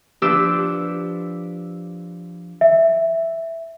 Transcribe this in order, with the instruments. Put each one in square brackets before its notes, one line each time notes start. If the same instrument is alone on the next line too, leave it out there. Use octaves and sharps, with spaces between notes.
[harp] F3 D4 G4 B4 D6 E6
[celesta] E5